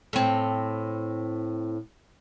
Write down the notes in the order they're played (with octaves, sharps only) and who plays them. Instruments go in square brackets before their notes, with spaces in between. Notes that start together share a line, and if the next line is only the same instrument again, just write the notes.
[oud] A2 C4